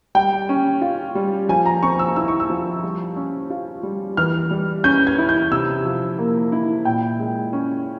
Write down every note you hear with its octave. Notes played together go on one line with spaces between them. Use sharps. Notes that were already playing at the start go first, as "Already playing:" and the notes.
G3 G5
C#4
F4
G3
F3 G#5
A#5
C4 C#6
E6
E4 E6
C#6
E6
F3
G3
C#4
F4
G3
E3 F6
G3
C#4 G6
G#6
E4
G6
C3 E6
F3
A#3
E4
A#2 G5
G#3
C#4